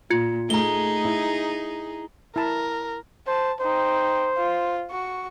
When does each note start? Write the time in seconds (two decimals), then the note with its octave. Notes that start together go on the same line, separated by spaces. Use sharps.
0.10 A#2 F4 G#6 C#7
0.50 A3 D#4 G#4 A#5 G7
1.05 E4
2.36 E4 A#4 A5 B5
3.27 C5 A5
3.61 D#4 C5 G5
4.37 F4
4.90 F#4 C#6